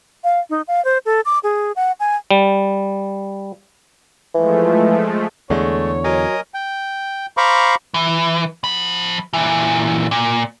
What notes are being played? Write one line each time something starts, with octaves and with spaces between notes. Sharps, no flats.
F5
D#4
F5
C5
A4
D6
G#4
F#5
G#5
G3
E3 F3 G#3 A3
E2 D3 G#3 A3 C#5
F#3 A#4 D#5 G#5
G5
C5 F5 A#5 B5 C#6 D6
E3
F3 B5
A#2 E3
A#2